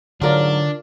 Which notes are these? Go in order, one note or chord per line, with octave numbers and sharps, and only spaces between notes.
G#2 D3 F#3 D4 F4 A#4 D5